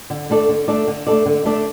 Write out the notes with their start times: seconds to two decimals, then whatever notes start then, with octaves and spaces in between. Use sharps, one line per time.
0.10 D3
0.30 A3 D4 A4 D5
0.49 D3
0.68 A3 D4 A4 D5
0.87 D3
1.07 A3 D4 A4 D5
1.26 D3
1.45 A3 D4 A4 D5